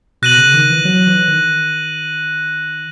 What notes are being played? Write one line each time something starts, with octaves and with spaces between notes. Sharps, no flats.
B2 F#6 A#6 D#7 F#7
C#3
D#3
E3
F#3
E3
D#3